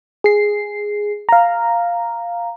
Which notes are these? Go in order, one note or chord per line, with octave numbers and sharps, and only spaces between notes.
G#4 C7
F5 A#5